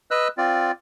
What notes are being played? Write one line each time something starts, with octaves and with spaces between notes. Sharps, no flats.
B4 D#5 E6 F#6
C4 F4 D5